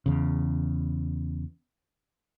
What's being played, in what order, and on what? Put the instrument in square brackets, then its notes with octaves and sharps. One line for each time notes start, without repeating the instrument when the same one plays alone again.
[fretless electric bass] E2 C#3